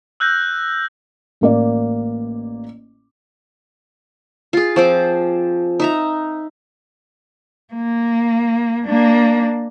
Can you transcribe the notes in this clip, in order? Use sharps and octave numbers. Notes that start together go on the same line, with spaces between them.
E6 F#6 G6 A#6
A1 A#3 D5
F4 G#4
F3 C4 D6
D#4 E5 A#5
A#3
A#3 D4